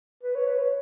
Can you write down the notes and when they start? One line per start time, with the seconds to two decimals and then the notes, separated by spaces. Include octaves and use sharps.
0.23 B4
0.35 C#5
0.47 B4
0.59 C#5